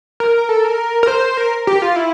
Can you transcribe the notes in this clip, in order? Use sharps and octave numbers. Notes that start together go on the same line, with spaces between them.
A#4
A4
A#4
A#4
C5
A#4
G4
F4
E4